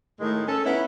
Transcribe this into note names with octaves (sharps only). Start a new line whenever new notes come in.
A2 D#3 G#3 A3
C#4 A4
B3 C#4 D#4 E4